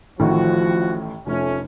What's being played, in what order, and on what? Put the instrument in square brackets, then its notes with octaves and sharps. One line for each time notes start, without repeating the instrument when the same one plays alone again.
[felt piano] A1 A2 D#3 [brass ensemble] F3 F#4
[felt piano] F1 [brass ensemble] F3 A3 C#4